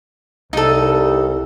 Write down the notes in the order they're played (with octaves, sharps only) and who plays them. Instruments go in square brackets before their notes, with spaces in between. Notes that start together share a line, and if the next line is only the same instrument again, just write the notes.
[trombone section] C2 [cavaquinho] D#4 A4